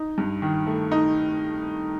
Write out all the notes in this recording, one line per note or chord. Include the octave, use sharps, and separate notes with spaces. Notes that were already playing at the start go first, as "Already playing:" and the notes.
Already playing: D#4
G2
D#3
A3
D#4